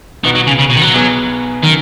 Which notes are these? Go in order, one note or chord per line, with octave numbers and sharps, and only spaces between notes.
B1 B2 D#3 B3 F#4
F#3
C#3
C#3
B2
D#3
F#3
B1 B2 B3 G#4
D#3 F#3 C#4